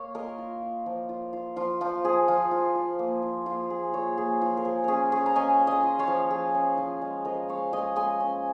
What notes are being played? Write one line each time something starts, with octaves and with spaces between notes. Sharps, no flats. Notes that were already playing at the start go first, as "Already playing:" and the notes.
Already playing: A#3 C#5 F5
F4 A#4 D#5
F4
F4
F3
F4
F4
F3 F4
F3 F4
F3 G#4
F3 F4
F4
F4
A#3
F4
A#3 F4
F4 G#4
F4 G#4 C#5
A#3 G#4
F3 F4
A#4
F3 G#4
C#4 G#4 A#4
C#4 G#4
A#5
C#4 D#5 G#5
C#4
D#5 G#5
F4
C#5 F5
F3
F3 G#4
C#4
F3 F4
G#3
F3 A#4 D#5
G#3 C#5 F5
G#3 D#5 G#5
G#3 D#5 G#5
C#4